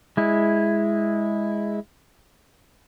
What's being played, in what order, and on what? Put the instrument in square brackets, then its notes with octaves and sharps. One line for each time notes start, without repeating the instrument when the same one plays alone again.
[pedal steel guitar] G#3 E4